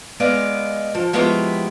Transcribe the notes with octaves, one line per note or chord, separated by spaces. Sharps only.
G#3 B3 D5 D#5 F5
F3
F3 G#3 B3 E4 G4 C#5